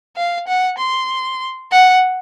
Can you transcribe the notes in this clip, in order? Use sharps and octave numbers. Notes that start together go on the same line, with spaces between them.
F5
F#5
C6
F#5